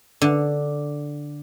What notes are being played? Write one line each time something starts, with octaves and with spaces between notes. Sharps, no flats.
D3